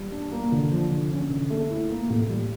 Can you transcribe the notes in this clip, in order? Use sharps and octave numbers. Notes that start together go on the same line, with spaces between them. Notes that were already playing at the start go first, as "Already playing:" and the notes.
Already playing: G3
D4
A#3
D3
F3
D3
C#4
D3
A3
E4
A#3
A2
G3